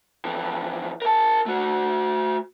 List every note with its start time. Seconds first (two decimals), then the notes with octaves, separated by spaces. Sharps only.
0.25 F2 E3
1.02 A#4 A5
1.46 A3 F#4